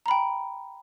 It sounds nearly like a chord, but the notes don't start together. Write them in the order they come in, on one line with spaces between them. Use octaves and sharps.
A#5 B5 G5